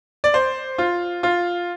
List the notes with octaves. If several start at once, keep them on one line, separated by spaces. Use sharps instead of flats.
D5
C5
F4
F4